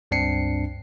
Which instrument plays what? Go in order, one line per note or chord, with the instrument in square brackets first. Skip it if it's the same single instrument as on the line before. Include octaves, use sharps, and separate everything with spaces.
[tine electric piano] C#2 G2 C4 D4 C7 C#7